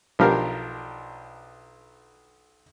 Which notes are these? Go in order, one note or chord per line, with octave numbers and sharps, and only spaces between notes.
B1 F3 D4 G4 A#4 F5